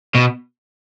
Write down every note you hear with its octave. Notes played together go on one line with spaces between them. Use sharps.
B2